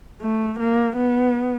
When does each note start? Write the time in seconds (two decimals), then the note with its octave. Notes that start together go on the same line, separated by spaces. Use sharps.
0.21 A3
0.59 A#3
0.97 B3